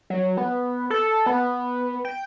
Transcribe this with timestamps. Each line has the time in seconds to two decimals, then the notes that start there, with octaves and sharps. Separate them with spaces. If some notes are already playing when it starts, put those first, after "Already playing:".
0.10 F#3
0.37 B3
0.90 A4
1.26 B3
2.05 G5